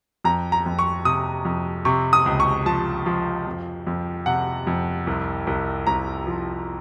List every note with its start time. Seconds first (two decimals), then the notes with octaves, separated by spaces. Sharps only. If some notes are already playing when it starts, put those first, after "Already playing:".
0.24 F2 A#5
0.52 A#5
0.66 F2
0.79 C#6
1.05 C3 D#6
1.45 F2
1.85 C3 C#6
2.13 D#6
2.26 C#2
2.40 C#6
2.66 F3 A5
3.06 F3
3.47 F2
3.87 F2
4.26 C3 F#5
4.67 F2
5.07 C2
5.47 C2
5.87 C2 A#5
6.27 F3